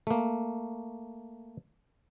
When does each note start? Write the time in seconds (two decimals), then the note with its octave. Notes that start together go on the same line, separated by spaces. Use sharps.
0.07 A3 A#3